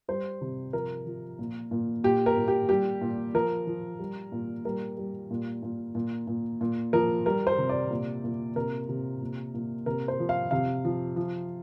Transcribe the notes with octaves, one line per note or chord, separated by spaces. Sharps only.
G3 C5
C3
F3 A#4
F3
A#2
A#2
A#2 G4
A#4
A#2
G4
G3 G4
A#2
F3 A#4
F3
G3
A#2
G3 A#4
G3
A#2
A#2
A#2
A#2
A#2
F3 A#4
G3 A#4
C5
C3
D5
A#2
A#2
C3 A#4
C3
A#2
A#2
C3 A#4
C5
F3
F5
C3 F5
F3
F3